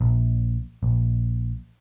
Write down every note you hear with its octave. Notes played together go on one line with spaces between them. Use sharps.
A#1
A#1